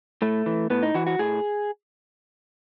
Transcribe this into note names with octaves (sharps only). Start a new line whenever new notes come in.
A2 A3
E3
A2 B3
D#4
E3 F#4
F#4
A2 G#4